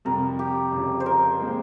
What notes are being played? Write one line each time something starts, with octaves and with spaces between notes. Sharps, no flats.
F2 C3 G3 A#4
G4
F1 F2 C#3 F3
C5
A#4
A#2 G#3 C4